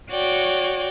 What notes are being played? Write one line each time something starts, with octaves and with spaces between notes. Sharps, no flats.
F#4 C#5 D5 G5